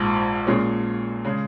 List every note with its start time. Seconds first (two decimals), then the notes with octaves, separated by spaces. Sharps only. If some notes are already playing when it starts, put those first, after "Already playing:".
Already playing: A#1 G#2 F3
0.47 A#2 G#3 C#4
1.25 C#3 G#3